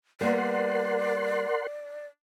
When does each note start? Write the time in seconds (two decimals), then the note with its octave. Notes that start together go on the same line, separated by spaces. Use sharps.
0.21 G3 A#3 B3 A#4 D5 F#5 C6